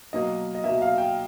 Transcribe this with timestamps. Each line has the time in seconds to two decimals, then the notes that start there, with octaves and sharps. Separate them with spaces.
0.13 B2 F#3 A#3 D#5
0.55 D#5
0.64 B2 F#3 A#3 E5
0.82 F5
0.98 G5